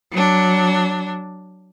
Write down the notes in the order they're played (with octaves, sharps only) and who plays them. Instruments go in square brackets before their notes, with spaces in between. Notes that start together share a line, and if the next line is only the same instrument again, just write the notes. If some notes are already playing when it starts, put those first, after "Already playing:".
[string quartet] F#3 D4